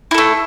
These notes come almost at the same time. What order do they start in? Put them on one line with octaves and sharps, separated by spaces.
E4 A4 A3